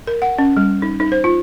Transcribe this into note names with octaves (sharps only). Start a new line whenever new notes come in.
A#4
F#5
C#4
G3
D#4
D#4
C5
F4